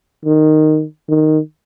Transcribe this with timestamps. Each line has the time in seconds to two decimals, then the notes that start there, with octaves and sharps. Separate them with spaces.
0.25 D#3
1.09 D#3